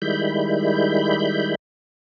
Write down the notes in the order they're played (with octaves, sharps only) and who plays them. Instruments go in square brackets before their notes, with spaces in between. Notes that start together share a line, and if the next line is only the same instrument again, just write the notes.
[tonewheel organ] D#3 G3 G#3 E4 B5 G6